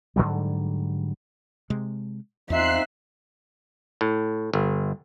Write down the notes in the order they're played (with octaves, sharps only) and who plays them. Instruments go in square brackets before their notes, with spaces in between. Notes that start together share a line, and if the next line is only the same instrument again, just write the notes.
[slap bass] G#2 D3 F#3 G3
[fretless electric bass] C3 G#3
[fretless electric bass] E2 [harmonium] C4 D#4 F4 [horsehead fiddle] E5 [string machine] F#6 C7
[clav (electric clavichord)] A2
G1